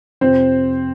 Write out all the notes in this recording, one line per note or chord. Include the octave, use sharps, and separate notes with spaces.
F2 C3 F3 C4 C5